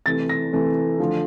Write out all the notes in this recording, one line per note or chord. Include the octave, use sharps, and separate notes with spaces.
C3 E3 A3 A6
A#6
C3 E3 A3
D3 F3 A3